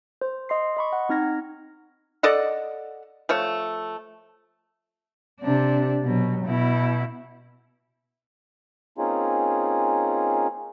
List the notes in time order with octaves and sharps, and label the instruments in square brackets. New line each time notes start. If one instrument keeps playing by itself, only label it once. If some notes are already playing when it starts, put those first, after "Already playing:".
[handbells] C5
D#5 C6 C7
D#5 B5 C#6
F#5
C4 D#4 F6 G#6 A#6
[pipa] A4 D5 D#5 F#5
F3 A3 C#5
[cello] C3 D4
B2 F#3
B2 E4
[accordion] A#3 C4 C#4 D#4 F4 G#4